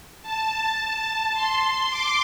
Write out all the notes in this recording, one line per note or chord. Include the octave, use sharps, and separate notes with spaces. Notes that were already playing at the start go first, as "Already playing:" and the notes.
A5
A5
C6
D6